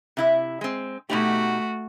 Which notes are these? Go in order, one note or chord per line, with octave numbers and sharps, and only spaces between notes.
C3 E4 E5
G#3 C4
B2 A3 D#4 F#4 G4